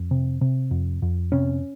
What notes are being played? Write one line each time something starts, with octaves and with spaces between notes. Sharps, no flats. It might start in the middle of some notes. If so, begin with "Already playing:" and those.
Already playing: F2
C3
C3
F2
F2
C3 C#4